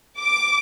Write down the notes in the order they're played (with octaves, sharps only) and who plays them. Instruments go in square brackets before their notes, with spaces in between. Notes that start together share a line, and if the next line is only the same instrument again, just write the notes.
[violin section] D6